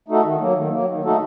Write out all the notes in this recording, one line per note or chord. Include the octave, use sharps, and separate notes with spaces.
A3 D#4 F#4 A4
D#3
F#3 A#3
D#3
F#3 A#3
D#3
A3 D#4 F#4 A4